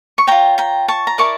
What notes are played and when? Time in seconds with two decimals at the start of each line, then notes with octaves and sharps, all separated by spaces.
0.18 C#6
0.27 F4 C#5 G5 A#5
0.58 G5 A#5
0.88 A5 C#6
1.07 A#5
1.18 E4 A#4 D5 A5 C#6